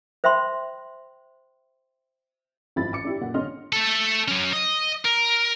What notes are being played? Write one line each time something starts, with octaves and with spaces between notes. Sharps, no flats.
C5 E5 G5 B5 C6
G#1 F#2 F3 E4 B5 A6
A1 D6 C#7
D4 E4 G4
F#2 A#2 F#5
G#1 D3 C#5 D#5 C6 F6
A3 A4
F#3 C#4
D#5
A#4